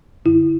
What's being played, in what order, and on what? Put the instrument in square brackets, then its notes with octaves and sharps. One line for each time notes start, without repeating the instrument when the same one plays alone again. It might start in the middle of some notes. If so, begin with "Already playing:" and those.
[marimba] F#2 D3 E4